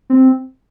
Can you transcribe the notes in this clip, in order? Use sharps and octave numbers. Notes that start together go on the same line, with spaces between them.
C4